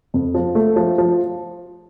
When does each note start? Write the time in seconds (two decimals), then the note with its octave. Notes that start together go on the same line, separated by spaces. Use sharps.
0.14 F2
0.34 F3
0.55 A3
0.76 F3
0.98 F3